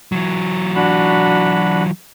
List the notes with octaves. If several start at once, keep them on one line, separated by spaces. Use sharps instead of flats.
E3 F#3
D4 F#4 B5